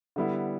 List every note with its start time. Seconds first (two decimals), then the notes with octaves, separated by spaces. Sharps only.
0.16 D3 G3 B3 E4